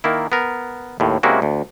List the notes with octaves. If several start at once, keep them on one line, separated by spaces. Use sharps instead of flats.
D#3 A#3 E4
B3 A#4
D#2 A2
C3 G#3 A#3 C#4 E4 F#4
D2